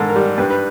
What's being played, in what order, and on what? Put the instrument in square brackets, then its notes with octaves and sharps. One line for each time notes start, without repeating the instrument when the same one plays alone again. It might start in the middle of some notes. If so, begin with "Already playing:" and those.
Already playing: [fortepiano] G#2 D#3 A4
A#4
G3
G2 B4
B4